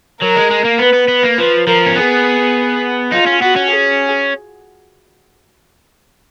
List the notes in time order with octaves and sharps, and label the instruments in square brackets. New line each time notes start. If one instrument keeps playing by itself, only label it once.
[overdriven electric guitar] F#3 [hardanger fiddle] A#4
[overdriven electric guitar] G#3
G#3
A#3
[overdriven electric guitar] B3 [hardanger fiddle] B4
[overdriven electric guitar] B3
B3
A#3
[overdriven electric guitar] F3 [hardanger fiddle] B4
[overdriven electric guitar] F3 [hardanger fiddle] A#4
[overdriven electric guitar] C#4
[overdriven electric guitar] B3 [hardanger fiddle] G#4
[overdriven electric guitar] D#4 [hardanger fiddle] F4
[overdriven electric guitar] C#4
[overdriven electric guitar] B3 [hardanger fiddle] F#4
[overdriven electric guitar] C#4
[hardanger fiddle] G#4